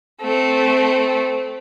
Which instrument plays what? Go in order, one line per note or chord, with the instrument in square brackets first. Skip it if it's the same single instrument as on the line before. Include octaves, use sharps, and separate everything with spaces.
[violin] A3 C4